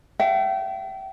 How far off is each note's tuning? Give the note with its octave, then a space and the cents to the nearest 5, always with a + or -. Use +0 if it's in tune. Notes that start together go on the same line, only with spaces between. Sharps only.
E5 +40 G5 -30